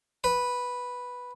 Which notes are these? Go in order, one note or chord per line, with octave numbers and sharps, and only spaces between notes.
B4